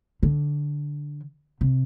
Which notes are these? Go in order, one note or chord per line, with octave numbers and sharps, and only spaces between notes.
D3
C3